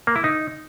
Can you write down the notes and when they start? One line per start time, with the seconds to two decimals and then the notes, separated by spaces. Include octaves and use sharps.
0.07 A#3
0.16 E4
0.24 D#4